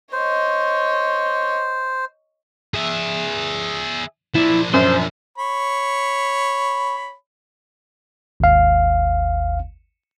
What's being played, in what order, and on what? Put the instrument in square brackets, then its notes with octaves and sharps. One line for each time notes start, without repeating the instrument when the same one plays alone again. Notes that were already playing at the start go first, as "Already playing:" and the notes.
[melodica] C5 [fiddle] C#5 D#5
[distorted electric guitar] G#4 E5
[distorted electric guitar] F3 D4 [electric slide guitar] E4
[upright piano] F#2 [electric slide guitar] C5
[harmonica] C#5 B5
[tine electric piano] G#1 D#2 F5